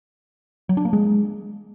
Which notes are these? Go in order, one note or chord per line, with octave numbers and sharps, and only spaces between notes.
F#3
D4
A#3
G#3